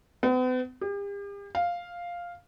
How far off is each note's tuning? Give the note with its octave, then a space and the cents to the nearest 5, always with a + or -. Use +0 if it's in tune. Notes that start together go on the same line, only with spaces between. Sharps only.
B3 +45
G4 +40
F5 +0